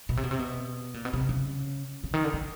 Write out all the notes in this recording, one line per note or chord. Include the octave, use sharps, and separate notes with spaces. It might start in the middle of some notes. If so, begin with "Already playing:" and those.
B2
C3
B2
C3
B2
A#2
B2
C3
C#3
C#3
D#3
D3
C#3